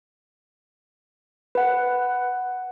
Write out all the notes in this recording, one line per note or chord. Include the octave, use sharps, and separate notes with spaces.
B4 F#5